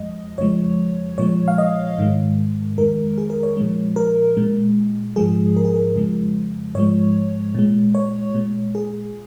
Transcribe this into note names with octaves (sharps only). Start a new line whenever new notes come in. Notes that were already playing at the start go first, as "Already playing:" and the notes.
Already playing: F2 F3 G#3 D#5
F2 C#3 F3 G#3 C#5
A#2 F3 G#3 C#5
F5
D#5
G#2 D#3 G#3
F2 D#3 G#3 A#4
G#4
A#4
C#5
A#2 F3 G#3
A#4
A#2 G#3
G#2 F3 G#3 G#4
A#4
G#4
A#4
F2 C#3 F3 G#3
G#2 F3 G#3 C#5
A#2 G#3
C#5
A#2 G#3
G#4